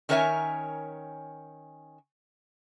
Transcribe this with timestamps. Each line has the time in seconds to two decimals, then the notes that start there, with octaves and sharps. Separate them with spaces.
0.09 D#3 C#4 A#4 C#5 E5 G#5